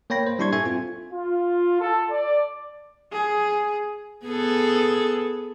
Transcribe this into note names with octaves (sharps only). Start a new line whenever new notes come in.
A#3 C#5 G5 B5 A#6
C5
G3 D4 E4 C6 C#6 G#6
A4 E5 G#5 C#6 G#6
C4 F4
F4
A4
D5
G#4
B3 G#4 A4